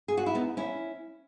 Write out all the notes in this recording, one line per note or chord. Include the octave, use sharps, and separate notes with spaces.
G#4
F#4
E4
B3 D#4
C#4 E4